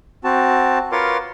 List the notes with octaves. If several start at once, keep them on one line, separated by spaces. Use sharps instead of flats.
C4 F#4 A5
F4 A#4 B4 C#5 C6 D6